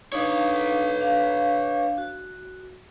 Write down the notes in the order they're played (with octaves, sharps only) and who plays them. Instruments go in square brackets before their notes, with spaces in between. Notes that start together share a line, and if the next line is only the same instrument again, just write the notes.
[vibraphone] D4 D#4 F5 [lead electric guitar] B4 C#5
[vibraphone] D4 F5
F#4